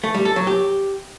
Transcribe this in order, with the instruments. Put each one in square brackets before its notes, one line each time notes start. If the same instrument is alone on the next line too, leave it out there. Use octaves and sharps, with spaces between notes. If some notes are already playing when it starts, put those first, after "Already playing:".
[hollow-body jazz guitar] A3
G3
A4
F#3
G4